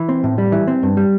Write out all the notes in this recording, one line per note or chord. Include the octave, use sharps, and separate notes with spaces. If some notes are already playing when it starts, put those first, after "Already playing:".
Already playing: E3
C4
A2
G3
E3
C4
G2
G3